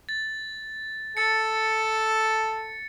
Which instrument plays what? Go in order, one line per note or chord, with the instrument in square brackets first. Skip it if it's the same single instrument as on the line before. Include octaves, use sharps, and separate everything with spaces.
[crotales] A6
[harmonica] A4 [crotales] A6 C#7